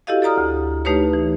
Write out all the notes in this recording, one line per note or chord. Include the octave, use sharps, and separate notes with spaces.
E4 F#4 G4 A4 D#5 F5
A4 D5 A#5 D#6 F6
D2
A3 D#4 G4 B4 C#5
E3